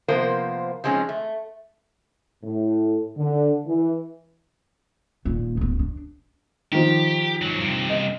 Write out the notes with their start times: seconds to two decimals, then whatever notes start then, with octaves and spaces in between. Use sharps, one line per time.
0.08 C3 F3 A#3 B3 C5
0.84 F3 F#3 G#3 C4 C#4 D#4
1.09 A3
2.42 A2
3.17 D3
3.66 E3
5.25 D#1 A#2
5.57 D1 B3
5.79 D4
6.72 D#3 F3 G4
7.42 G#2 F#3
7.60 G2 C3
7.90 D#5